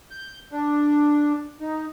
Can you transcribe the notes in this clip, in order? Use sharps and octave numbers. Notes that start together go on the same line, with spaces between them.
G6
D4
D#4